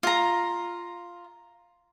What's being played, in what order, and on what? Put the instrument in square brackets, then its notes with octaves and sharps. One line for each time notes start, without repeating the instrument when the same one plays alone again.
[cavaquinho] F4 A#5